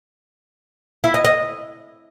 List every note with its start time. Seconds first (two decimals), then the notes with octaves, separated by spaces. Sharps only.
1.04 E4
1.14 D#5
1.25 D#5